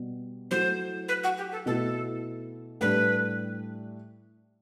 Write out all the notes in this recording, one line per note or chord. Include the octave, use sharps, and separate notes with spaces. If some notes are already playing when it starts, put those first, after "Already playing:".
Already playing: B2 G3 B3
F#3 A3 E4 C5
B4
F#4
G4
A4
B2 A3 E4 A4
A2 G3 D4 B4